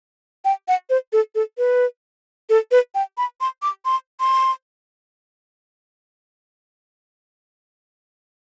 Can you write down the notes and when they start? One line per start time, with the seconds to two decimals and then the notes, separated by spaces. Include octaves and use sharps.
0.45 G5
0.68 F#5
0.90 C5
1.13 A4
1.35 A4
1.58 B4
2.50 A4
2.71 B4
2.95 G5
3.18 B5
3.41 C6
3.62 D6
3.85 C6
4.20 C6